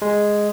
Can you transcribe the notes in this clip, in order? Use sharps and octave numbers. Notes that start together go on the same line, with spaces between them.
G#3